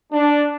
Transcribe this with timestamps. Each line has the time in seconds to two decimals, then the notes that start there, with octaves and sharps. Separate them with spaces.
0.12 D4